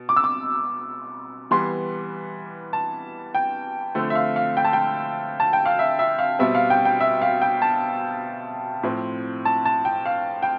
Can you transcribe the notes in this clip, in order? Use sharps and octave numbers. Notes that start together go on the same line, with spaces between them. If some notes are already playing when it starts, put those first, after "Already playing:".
Already playing: B2
D6
E6
D6
E3 G3 B3 C6
A5
G5
D3 F3 A3 C4
E5
F5
F5
G5
A5
G5
A5
G5
F5
E5
E5
F5
B2 G3 C4 E5
F5
G5
G5
E5
F5
G5
A5
A2 F3 C4
A5
A5
G5
F5
G5